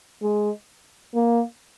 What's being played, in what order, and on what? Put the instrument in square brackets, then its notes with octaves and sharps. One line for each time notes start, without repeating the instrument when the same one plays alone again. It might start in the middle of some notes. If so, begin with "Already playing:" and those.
[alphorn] G#3
A#3